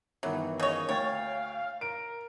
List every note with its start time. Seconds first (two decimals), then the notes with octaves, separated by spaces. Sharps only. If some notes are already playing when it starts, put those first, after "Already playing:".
0.23 G1 D#3 E3 F#3
0.60 C#3 C#5 D#5
0.89 D2 C#5 F5 G5 A6
1.81 A#4 D7